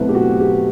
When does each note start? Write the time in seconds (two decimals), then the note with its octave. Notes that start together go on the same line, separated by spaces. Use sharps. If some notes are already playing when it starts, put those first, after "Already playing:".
Already playing: B2 F#3 A3 C4 E4 B4
0.09 G4
0.15 F#4
0.40 G4